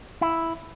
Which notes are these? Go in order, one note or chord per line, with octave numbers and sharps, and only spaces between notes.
E4